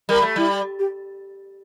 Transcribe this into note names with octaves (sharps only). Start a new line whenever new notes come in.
G3 A#4
A3
G3 E4
G4